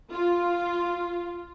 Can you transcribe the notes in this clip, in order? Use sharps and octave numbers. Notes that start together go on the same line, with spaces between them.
F4